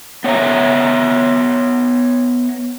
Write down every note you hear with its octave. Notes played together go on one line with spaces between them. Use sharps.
B3 C#5 E5 A#5